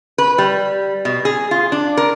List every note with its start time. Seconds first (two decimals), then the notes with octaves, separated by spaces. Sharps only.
0.18 B4
0.38 G3
1.05 B2
1.25 G#4
1.51 F4
1.72 D4
1.97 A#4